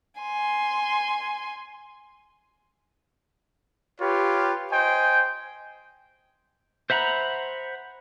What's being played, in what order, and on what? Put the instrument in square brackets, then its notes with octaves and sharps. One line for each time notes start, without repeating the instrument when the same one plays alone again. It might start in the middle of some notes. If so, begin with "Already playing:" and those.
[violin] G#5 C6
[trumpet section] F4 G4 B4 C#5
C5 D#5 G5 G#5
[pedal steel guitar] C5 E5 F#5 A#5 B5